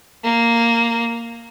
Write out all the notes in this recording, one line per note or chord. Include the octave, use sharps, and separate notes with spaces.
A#3